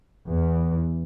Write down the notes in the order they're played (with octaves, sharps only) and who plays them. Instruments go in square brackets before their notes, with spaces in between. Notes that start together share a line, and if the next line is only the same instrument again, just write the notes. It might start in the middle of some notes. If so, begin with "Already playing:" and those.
[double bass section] E2